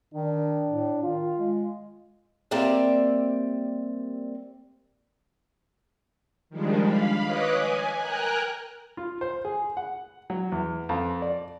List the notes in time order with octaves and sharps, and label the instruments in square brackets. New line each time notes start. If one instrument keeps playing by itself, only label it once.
[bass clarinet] D#3 [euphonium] D4
[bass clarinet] A2
[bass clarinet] D#3 [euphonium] F4
[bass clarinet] G#3
[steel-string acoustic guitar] G3 A#3 C4 G4 D5 E5
[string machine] D#3 F3 G3 G#3 D4
F5 B5
B4 C#5 D#5 D6 D#6 F#6
G#5
A#4 G5 G#5 A#5 F#6
[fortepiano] F4
C5
G#4
F#5
F#3
E2
F2
D5